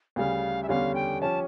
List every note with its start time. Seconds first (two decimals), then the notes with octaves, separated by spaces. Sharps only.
0.16 D2 C#3 G3 F5
0.63 E5
0.69 E2 D3 G3 C#4 F5
0.95 G5
1.21 F3 C#4 G4 A5